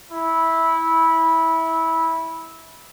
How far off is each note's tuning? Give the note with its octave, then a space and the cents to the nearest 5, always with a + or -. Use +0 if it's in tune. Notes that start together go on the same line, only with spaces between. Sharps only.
E4 -15